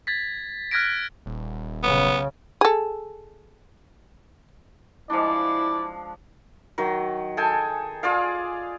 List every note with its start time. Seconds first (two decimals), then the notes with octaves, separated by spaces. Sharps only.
0.07 G#6 A6 B6
0.71 F6 F#6 G#6 A#6 B6 D7
1.26 D#1
1.83 B1 C#3 B3
2.61 G#4 A4
5.10 F3 G#3 D4 E4 D5
6.78 D#3 F#3
7.37 G#4 A4 G5 G#5
8.03 F4 G#4 D5 F5